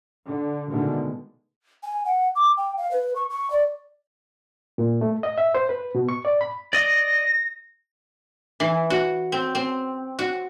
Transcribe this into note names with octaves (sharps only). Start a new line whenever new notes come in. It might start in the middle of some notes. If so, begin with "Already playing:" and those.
D3
B2 D3 D#3 G#3 A3
G#5
F#5
D6
G5
F5
B4
C#6
C#6
D5
A#2
A3
D#5
E5
C5
B4
B2
C#6
D5
B5
D5 D#5 A#6
E3
F#4
C4
C4
F#4